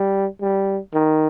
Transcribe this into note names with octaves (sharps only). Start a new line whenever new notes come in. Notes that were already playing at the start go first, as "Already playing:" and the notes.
Already playing: G3
G3
D#3